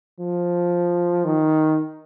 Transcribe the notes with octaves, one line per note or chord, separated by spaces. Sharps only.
F3
D#3